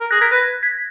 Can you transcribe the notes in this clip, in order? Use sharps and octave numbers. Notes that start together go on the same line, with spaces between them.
A#4
G#4 F#6 A#6
A#4 G#6 B6
B4 F#6 A#6
G#6 B6